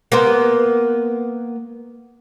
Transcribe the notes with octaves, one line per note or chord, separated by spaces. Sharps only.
A#3 B3 C5